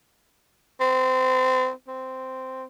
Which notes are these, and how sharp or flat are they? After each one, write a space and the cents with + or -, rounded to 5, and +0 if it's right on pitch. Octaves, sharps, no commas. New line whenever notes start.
C4 -25
C4 -10